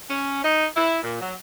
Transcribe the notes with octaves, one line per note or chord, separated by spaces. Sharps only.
C#4
D#4
E4
A#2
F#3